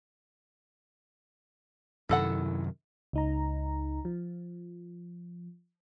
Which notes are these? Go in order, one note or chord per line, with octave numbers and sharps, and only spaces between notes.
F#2 C3 D#3 E4 A4 F#5
C#2 D#4 A#5
F3